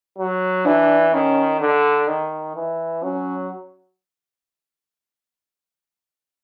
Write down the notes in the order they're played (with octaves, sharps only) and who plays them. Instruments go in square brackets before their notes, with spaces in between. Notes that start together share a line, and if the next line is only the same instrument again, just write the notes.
[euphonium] F#3
[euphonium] E3 [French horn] D4
[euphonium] D#3 [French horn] C#4
[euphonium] D3
D#3
E3
[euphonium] F#3 [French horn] C#4